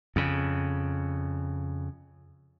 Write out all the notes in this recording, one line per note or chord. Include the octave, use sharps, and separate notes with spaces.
F2 C#3